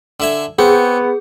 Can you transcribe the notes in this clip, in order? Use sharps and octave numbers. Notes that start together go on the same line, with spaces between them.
D3 E5 G#5
B3 C4 G#4